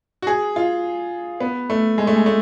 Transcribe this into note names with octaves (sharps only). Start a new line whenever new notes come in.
F#4
G#4
F4
B3
A3
G#3
A3
G#3
A3